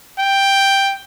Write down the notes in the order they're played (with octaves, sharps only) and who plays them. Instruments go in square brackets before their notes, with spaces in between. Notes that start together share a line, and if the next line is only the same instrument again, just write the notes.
[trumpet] G5